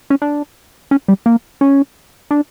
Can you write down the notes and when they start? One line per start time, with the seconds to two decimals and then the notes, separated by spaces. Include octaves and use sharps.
0.10 C#4
0.22 D4
0.91 C#4
1.08 G3
1.26 A#3
1.61 C#4
2.31 D4